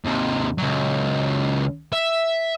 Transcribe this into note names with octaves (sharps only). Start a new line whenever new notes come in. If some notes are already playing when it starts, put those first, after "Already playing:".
D#2 C3
C#2 F#3
E5